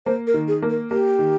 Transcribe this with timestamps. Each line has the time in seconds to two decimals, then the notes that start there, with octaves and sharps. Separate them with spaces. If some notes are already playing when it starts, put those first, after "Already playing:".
0.06 A#3 C5
0.27 A#4
0.34 D#3
0.48 G#4
0.62 A#3
0.70 A#4
0.91 A#3 G4
1.19 D#3